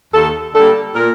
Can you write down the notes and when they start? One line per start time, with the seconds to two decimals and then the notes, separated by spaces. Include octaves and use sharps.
0.13 D#2 A4
0.54 D3 G3 A#3 A4
0.95 A#2 A#4